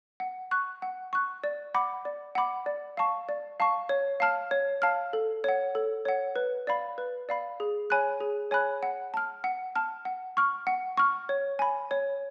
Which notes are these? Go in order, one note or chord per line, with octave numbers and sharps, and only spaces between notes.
F#5
C#6 F#6
F#5
C#6 F#6
D5
F#5 B5 D6
D5
F#5 B5 D6
D5
F5 A5 C#6
D5
F5 A5 C#6
C#5
F5 A5 F6
C#5
F5 A5 F6
A4
C#5 F#5
A4
C#5 F#5
B4
D5 F5 B5
B4
D5 F5 B5
G#4
C#5 G#5 B5 F#6
G#4
C#5 G#5 B5 F#6
F#5
A5 F6
F#5
A5 F6
F#5
C#6 F6
F#5
C#6 F6
C#5
G#5 B5
C#5